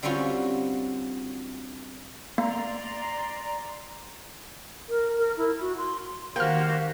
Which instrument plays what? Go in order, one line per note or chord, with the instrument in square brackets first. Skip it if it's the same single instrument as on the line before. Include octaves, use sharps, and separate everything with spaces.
[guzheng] D3 G3 C4 C#4 F4 F#4
[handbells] A#3 [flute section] D5 A#5 C6
[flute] A#4
A#4
E4
F#4
C6
[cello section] D#3 G4 [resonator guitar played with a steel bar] A#3 [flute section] F#4 C5 F5 [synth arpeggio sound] G5 F6